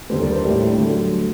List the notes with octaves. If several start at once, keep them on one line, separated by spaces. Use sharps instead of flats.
D#2 D3 G3 A4 C5
A#4 D5
A4 C5
A2 G3 D4
D3 F#3 A3